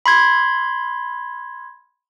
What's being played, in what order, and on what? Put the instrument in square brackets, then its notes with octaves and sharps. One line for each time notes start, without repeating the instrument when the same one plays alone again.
[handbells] B5 C6 G#6